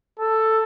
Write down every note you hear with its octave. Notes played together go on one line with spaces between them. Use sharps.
A4